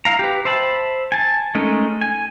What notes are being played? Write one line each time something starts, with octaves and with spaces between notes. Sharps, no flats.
E4 F5 A#5
G4 B4
C5 E5 A5 B5
G#5 A5
G#3 A3 C#4 D#4 A#4
G#5